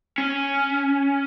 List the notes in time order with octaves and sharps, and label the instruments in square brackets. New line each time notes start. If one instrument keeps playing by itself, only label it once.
[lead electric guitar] C#4